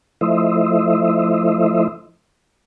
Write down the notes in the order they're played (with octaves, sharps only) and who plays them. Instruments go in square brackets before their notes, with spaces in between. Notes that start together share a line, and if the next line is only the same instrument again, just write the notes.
[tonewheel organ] F3 A3 E4 C5 D#5 E5